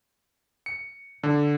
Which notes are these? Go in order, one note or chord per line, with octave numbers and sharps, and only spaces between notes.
C#7
D3